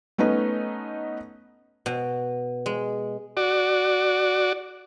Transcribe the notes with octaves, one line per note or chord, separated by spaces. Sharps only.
A3 B3 C#4 D#4 B4
B2
G#3
F#4 D5